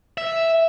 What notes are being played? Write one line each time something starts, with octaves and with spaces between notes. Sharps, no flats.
E5